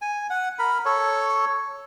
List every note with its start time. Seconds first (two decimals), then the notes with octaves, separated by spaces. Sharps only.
0.02 G#5
0.30 F#5
0.59 A#4 B5
0.85 A4 C#5